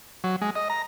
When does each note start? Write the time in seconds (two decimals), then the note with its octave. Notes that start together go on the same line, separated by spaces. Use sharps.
0.24 F#3
0.41 G#3
0.55 D#5
0.70 A#5